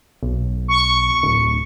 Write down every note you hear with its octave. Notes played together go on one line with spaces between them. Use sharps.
B1
C#6
D1